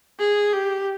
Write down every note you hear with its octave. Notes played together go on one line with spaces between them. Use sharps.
G#4
G4